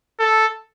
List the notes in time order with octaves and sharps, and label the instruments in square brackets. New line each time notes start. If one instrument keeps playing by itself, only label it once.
[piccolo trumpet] A4